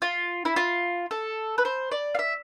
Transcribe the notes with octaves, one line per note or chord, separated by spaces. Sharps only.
F4
E4
F4
A4
B4
C5
D5
F5
E5